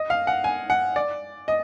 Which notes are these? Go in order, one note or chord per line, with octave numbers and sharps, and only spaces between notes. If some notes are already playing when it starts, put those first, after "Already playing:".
Already playing: D#5
F5
F#5
G#5
F#5
D5
D#5